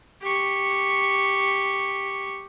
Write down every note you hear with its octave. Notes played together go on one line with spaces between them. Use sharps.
G4 C#6